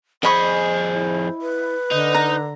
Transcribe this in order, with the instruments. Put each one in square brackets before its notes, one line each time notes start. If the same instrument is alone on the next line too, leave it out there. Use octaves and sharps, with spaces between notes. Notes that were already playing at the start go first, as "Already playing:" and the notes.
[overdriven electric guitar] F2 G#4 [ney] C5 [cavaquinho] D#5 B5 C#6
[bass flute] E4
[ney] B4
[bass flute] D3 [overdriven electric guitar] D#4
[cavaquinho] A#5